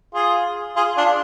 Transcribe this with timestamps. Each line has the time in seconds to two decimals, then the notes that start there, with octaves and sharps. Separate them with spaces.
0.14 F4 G#4
0.76 F4 G#4
0.97 D4 F4